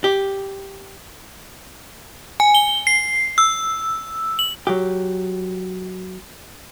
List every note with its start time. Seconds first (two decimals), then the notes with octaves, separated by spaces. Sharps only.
0.04 G4
2.40 G#5
2.55 G7
2.87 C7
3.38 E6
4.39 F#7
4.67 F#3 G4